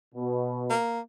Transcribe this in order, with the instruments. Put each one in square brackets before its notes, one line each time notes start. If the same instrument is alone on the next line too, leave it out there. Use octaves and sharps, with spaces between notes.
[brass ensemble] B2
[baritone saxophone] A#3